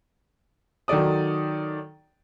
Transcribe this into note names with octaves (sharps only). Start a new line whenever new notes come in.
D#3 F#3 A4 D5 D#6